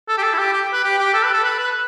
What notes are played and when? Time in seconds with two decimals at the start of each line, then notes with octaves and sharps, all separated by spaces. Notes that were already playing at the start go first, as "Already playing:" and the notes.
0.08 A4
0.18 G4
0.23 A4
0.34 E4
0.38 G4
0.53 G4
0.73 B4
0.84 G4
0.98 G4
1.14 A4
1.23 B4
1.33 A4
1.44 B4
1.59 B4